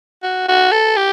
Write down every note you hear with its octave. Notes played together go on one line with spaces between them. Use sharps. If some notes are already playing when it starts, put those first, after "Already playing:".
F#4
F#4
A4
G4